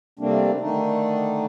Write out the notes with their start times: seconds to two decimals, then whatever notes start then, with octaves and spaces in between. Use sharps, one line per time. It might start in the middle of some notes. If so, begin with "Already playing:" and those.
0.19 C3 G3 A3 A#3 C4 D4
0.60 D3 D#3 A3 D4 D#4